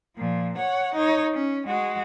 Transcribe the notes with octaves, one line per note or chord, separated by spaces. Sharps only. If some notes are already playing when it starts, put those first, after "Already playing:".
A#2 F3
C#5 F#5
D#4 C#5
C#4
G#3 F#4